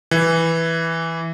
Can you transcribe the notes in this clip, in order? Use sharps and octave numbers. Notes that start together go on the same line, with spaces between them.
E3